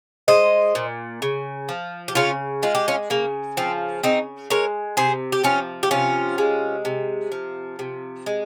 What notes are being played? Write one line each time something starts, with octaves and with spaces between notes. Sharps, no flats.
G#3 C5 D#5
A#2
C#3
F3
G4
C#3 C#4 F4
G#3 F4
G4
C#4 F4
C#3 A#3
F3 C4
C#3 C4 D#4
G#3 A#4 C#5
C3 G#4 C5
G4
F3 C#4 F4
G4
C3 C#4 F4
G#3
C3
F3
C3
G#3